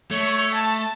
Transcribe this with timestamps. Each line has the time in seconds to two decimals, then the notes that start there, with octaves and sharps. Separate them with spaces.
0.11 A3 C#5
0.55 A5